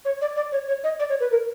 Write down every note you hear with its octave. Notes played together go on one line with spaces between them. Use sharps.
C#5
D5
D5
C#5
C#5
D#5
D5
C#5
B4
A#4